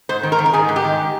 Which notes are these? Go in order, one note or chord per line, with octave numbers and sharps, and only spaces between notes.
G#2 C5
D#3
A#4
D#3
A#4
G#2 G#4
G#2
G4
D#3